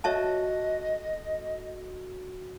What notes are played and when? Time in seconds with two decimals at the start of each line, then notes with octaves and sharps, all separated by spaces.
0.04 F#4 A4 C#5 D#5 E5 A5